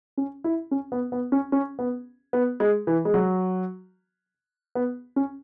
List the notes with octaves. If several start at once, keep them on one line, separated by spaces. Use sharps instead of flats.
C#4
E4
C#4
B3
B3
C#4
C#4
B3
B3
G#3
E3
G#3
F#3
B3
C#4